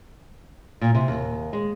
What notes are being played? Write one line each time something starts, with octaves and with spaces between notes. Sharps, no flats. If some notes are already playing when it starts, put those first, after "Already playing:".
A#2
C3
D#2
G#3